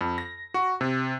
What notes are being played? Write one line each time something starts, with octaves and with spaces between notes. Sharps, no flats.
F2
A#6
F#4
C3